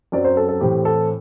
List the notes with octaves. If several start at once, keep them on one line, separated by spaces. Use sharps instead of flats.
F#2 F#3 C4 D5
C5
A4
A4
A2 E3 A3 C4 G4
A4